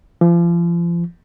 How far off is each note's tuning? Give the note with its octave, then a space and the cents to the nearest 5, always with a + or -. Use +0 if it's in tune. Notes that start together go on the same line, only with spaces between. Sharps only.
F3 -35